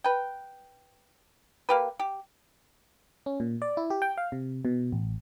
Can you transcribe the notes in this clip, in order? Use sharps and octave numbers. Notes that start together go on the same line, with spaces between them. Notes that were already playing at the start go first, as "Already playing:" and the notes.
B4 G5
A#3 G4 B4
G4
C#4
A#2
D5
E4
G4
G5
F5
C3
B2
A1